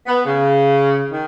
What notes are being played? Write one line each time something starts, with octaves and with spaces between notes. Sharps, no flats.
B3
C#3
D#3